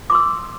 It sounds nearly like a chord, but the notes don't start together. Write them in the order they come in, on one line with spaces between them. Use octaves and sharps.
D6 C6 E6